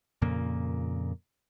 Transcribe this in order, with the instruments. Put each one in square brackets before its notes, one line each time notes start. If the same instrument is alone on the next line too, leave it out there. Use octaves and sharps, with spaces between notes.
[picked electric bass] F2 A#2 C#3 A#3